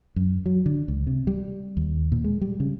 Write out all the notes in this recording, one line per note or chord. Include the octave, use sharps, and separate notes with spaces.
F#2
F#3
D3
C#2
C3
G3
D#2
A#2
G#3
G3
C#3